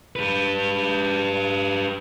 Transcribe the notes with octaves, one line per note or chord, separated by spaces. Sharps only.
G4 B4